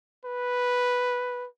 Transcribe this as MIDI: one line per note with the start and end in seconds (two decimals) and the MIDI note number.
0.25 1.47 71